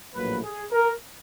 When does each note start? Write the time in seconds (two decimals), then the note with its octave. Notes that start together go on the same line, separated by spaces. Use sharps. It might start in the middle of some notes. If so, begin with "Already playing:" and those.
0.14 A#1 A2 F#3 A#3 B4
0.44 G#4
0.72 A#4